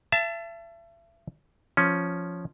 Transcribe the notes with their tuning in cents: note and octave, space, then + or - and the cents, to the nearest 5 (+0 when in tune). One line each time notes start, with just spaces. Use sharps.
E5 +35 A5 +0
F3 +0 C#4 +0